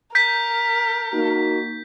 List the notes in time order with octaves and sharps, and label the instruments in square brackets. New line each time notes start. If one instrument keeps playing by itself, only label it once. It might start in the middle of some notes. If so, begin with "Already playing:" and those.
[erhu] A#4 [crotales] G6 B6
[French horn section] A#3 D#4 F#4